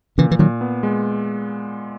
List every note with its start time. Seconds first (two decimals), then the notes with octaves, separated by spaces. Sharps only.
0.18 A#2 C#3 E3
0.31 E3
0.39 A#2 D#3 F#3
0.61 B3
0.83 G#3